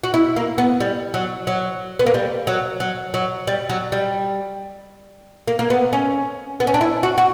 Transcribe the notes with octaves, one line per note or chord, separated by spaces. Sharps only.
F#4
E4
A#3
B3
G3
F#3
F#3
B3
A#3
G3
F#3
F#3
F#3
G3
F#3
G3
A#3
A#3
B3
C#4
B3
C#4
D4
E4
F#4
F#4